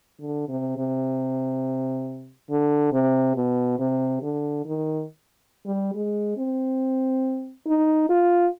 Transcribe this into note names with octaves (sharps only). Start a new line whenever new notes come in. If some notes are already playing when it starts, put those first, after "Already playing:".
D3
C3
C3
D3
C3
B2
C3
D3
D#3
G3
G#3
C4
D#4
F4